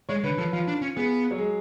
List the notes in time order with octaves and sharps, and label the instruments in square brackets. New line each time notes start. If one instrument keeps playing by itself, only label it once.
[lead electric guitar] G#3 [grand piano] C#5
[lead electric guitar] D3 [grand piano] B4
[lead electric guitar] F3 [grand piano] A4
[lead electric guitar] F3 [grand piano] F4
[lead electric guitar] D4
C#4
[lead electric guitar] B3 [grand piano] G#4
[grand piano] F#3
G#3